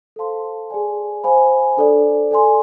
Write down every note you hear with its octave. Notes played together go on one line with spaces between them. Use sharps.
A4 C5 F5 A5 C6
G#4 D5 G#5
C5 F5 G#5 B5
D4 A4 D5
A4 D5 G#5 C6